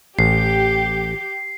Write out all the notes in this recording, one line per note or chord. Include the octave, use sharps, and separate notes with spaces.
A1 G4 C7